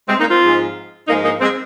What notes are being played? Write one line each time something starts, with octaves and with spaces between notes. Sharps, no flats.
G#3 C4
A#3 D#4
C4 F4
G#2 F3 G#3
G#2 F3 G#3 A#3 D#4
A#3 D#4
G#3 C4